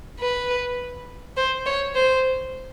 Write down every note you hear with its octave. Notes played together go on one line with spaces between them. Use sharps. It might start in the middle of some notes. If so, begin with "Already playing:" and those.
B4
C5
C#5
C5